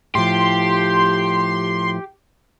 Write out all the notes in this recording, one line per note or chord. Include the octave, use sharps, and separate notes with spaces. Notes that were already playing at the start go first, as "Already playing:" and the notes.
A2 F3 G4 C6